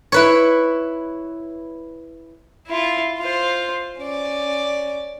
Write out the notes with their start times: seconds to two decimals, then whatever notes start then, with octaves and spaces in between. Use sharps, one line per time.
0.12 E4 B4 C#5
2.67 E4 F4
3.18 F4 C5
3.99 C#4 D5